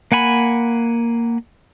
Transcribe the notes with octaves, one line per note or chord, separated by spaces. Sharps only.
A#3 F#5 G#5 B5